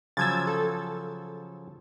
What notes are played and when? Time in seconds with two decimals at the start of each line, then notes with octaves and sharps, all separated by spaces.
0.17 C#3 F3 F#3 E6 G#6 A6
0.47 A4